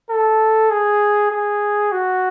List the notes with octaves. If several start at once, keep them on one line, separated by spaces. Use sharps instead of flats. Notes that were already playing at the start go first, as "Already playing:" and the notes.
A4
G#4
G#4
F#4